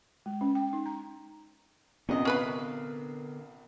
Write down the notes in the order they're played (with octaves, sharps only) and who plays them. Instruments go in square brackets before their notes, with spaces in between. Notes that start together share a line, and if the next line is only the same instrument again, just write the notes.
[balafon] G#3
C#4
G5
D#4
A#5
[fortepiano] A#1 C3 D#5 [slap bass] B3 [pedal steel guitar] C#4
[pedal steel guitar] D3 A#4 F5 [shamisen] C#4 B4 B5